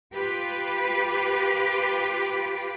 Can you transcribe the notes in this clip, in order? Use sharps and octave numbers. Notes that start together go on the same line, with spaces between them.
F4 G4 B4